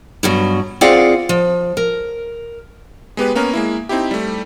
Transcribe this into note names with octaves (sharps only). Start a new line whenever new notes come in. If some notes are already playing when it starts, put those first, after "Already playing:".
G2 B2 F#3
C4 F4 G#4 D5 F5 F#5
F3
A#4
G#3 B3 G4 B4
A#3 B3 C#4 A#4
G#3 A#3 E4
C4 D#4 E4 G4
G3 A3